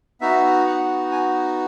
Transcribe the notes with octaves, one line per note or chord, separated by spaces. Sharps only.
B3 D#4 F#4 E5
F#5
G#5